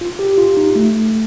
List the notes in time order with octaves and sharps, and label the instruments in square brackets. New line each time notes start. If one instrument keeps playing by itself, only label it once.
[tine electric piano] F4
G4
F4
D#4
A3